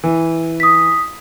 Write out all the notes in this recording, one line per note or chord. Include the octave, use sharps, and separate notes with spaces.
E3
D#6 B6